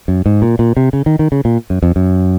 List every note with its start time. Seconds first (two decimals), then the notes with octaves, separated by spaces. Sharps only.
0.08 F#2
0.26 G#2
0.42 A#2
0.59 A#2
0.77 C3
0.93 C#3
1.06 D#3
1.19 D#3
1.32 C#3
1.45 A#2
1.70 F#2
1.83 F2
1.96 F#2